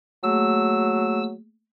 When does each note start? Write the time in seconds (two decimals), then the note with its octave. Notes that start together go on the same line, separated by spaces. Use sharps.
0.23 F#3 A3 A#3 G#4 E6